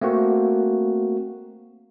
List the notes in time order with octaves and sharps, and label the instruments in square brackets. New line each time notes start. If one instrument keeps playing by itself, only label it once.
[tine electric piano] A3 A#3 C4 F#4